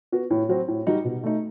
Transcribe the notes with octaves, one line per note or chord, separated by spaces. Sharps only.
B3 F#4
A2
F#3 C4 F#4
A2
G3 D#4 F#4
B2
A3 D#4